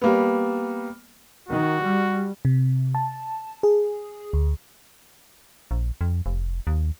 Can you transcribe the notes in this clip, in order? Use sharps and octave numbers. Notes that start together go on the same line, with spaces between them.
G3 A#3 B3
D#3 F#4
G3
C3
A5
G#4
D2
A#1
F2
F1
D#2